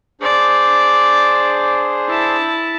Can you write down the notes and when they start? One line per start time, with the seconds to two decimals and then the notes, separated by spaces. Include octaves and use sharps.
0.21 D4 G#4 C5 D5
2.09 E4 A5